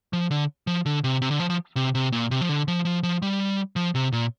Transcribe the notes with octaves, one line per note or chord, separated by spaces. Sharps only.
F3
D3
F3
D3
C3
C3
D3
F3
F3
C3
C3
A#2
C3
F3
D3
F3
F3
F3
G3
F3
C3
A#2